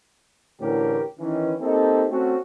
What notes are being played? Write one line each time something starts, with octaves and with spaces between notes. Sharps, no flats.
D2 A2 E3 C#4 G4 A#4
D#3 E3 C#4
A#3 C4 D#4 G4 A4
A3 C4 C#4 F#4